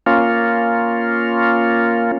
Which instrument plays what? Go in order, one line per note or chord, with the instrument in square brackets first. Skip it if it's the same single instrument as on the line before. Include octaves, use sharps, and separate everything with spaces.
[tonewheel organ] A#3 C#4 F4